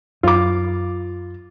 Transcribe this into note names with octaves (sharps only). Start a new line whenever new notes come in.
F#2 F4 D6